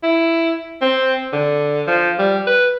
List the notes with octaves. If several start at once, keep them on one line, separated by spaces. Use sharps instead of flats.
E4
C4
D3
F3
G3
B4